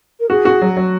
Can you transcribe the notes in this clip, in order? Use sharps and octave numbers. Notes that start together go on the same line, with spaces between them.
A#4
F#4 G#4
F#4
F#3
F#3